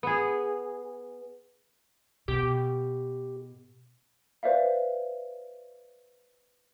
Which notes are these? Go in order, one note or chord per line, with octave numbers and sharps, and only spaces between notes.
B3 G#4
B2 G4
B4 C5 D5 E5 F5